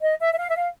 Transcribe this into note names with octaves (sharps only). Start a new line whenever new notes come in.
D#5
E5
E5
F5
E5
F5